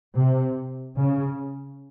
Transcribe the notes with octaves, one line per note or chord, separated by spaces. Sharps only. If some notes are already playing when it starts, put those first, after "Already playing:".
C3
C#3